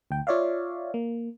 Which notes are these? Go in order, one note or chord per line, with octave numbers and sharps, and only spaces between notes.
D2 G5
F4 C#5 D5 E5 F5
A#3